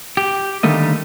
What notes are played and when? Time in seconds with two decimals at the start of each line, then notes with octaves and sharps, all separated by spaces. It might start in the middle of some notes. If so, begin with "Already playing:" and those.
0.17 G4
0.63 D3 D#3 G3 A3 A#3 D#5